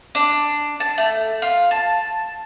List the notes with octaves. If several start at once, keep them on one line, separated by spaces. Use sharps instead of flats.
D4
A5
A3
F4
A5